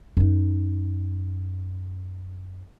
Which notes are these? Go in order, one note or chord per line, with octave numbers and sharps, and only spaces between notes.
F#2 D#4